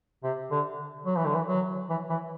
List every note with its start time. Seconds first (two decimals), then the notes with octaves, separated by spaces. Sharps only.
0.24 C3
0.51 D3
1.06 F#3
1.16 E3
1.26 D3
1.35 E3
1.48 F#3
1.90 E3
2.10 E3